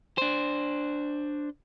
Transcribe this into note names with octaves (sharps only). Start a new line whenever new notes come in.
D4 C5